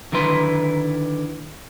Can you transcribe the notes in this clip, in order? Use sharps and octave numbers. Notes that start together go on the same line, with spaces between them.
D3 D#3 E4 B4 C6